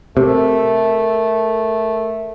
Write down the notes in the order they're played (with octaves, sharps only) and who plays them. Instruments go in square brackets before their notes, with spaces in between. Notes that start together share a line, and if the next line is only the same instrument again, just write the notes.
[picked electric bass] C3 [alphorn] A3 [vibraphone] A#4 E6